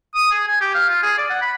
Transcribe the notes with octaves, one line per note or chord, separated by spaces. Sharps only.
D#6
G#4
G#5
G4
F5
F4
G#4
D5
F#5
B5